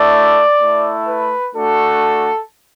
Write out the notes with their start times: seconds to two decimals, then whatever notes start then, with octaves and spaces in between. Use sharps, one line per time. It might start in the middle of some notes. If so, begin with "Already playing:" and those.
Already playing: A3 E4 D5
0.60 A3 E4
1.07 B4
1.54 A3 D4 F#4 A4